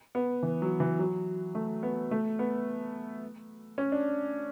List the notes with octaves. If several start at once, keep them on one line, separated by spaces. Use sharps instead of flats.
B3
E3
F#3
E3
F#3
A3
B3
A3
B3
C#4
D4